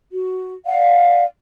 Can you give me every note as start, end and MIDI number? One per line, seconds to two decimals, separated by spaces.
0.12 0.53 66
0.66 1.23 74
0.66 1.23 77
0.66 1.23 78